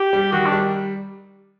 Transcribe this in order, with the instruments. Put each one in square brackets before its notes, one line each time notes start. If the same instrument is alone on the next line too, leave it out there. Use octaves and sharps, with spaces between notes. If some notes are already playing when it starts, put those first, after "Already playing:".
Already playing: [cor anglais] G4
[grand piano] G3
[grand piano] D#3 [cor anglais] F#4
[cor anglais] D4
[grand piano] G3